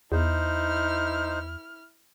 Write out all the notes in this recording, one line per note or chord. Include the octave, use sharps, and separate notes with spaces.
E2 D#4 E4 C5 F6